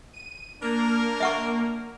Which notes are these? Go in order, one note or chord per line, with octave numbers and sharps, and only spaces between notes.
D#7
A#3 D4 A#4
E5 F#5 C#6